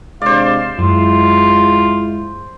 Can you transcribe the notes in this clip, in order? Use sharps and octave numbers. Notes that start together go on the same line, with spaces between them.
C3 G#3 D4 C5 D5 F5
F#2 G#3 E4 F4